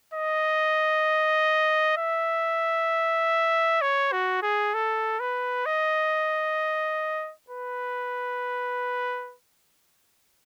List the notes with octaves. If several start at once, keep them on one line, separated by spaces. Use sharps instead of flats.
D#5
E5
C#5
F#4
G#4
A4
B4
D#5
B4